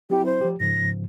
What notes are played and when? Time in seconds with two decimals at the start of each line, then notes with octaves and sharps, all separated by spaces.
0.10 F#3 C4 E4 G4
0.26 C5
0.41 F3 G4
0.60 G#2 C#3 F3 A#6